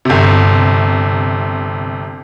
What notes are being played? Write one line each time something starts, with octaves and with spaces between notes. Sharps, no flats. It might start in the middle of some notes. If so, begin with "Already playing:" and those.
G1 C3